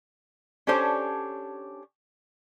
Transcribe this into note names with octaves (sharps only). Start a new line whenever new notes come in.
C#4 D4 G4 A4 C5 C#5